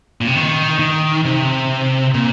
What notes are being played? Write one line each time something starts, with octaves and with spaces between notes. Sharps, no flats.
A#2
C3
D#3
D#3
C3
A#2